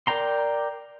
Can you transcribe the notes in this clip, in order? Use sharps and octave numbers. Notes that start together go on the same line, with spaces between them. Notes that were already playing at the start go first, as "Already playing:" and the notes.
A#4 D5 G5 A#5 C6